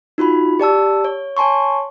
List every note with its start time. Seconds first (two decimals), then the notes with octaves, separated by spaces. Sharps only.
0.18 D#4 F4 F#4 B5
0.60 G4 D5 A5 E6
1.05 C#5
1.37 C#5 G#5 A5 C6 C#6